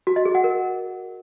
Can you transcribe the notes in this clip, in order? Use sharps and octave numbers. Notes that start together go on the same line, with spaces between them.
F#4
D#5
G#4
F#5
A#4